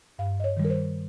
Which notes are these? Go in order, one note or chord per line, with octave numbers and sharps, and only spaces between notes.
G2 F5
D#5
C#5
D#3 G3
A#4
C5